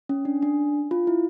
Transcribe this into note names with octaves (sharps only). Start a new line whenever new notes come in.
C#4
D4
D4
F4
E4